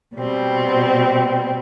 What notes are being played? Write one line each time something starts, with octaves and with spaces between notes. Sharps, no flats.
B2 G3 C4